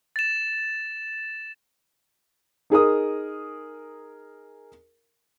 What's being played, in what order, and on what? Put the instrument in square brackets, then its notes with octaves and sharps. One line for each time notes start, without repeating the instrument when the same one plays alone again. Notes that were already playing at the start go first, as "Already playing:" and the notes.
[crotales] A6 E7
[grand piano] D#4 G#4 A#4 D#6